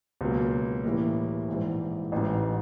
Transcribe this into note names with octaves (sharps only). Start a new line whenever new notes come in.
C#2 B2 F#3 A#3
A2 E3 G3 A#3
A#1 G#2 E3
A1 G#2 E3